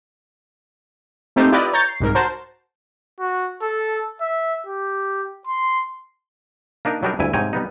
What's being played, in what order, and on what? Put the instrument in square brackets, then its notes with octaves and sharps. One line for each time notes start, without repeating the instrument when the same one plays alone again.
[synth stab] A3 A#3 C4 D#4 G4 C5
E4 F4 G4 B4 D5 D#5
C#5 A#5 G6 A6 C#7
C7
C2 G#2 A#4
F#4 A#4 C5 A5
[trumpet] F#4
A4
E5
G4
C6
[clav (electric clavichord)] A#3 D4 D#4 A#4
F#3 G3 D4 D#4 A#4
D2 G2 E4 G#5
G#2 C3 C#5 G5 G#5 A#5
G3 B3 D#4